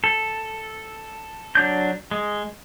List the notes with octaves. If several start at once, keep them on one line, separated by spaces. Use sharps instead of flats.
A4
F#3 D4 G6
G#3